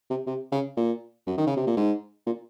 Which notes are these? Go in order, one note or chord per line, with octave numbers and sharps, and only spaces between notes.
C3
C3
C#3
A#2
F#2
D#3
C#3
C3
A#2
G#2
A#2